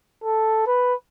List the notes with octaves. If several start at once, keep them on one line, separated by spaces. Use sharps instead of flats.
A4
B4